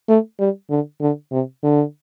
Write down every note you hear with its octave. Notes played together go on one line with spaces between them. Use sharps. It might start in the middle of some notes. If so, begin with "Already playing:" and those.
A3
G3
D3
D3
C3
D3